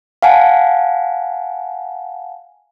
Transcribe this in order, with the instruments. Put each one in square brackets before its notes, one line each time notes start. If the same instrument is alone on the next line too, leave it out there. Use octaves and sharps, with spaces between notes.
[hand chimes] F5 F#5 G#5 A5